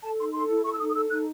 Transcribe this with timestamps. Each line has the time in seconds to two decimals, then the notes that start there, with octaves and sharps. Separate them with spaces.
0.03 A4 A5
0.19 D#4 C6
0.34 A4 C6
0.50 E4
0.65 A4 C#6
0.74 E6
0.80 D#4 D#6
0.90 D#6
0.95 A4 E6
1.10 D#4 F#6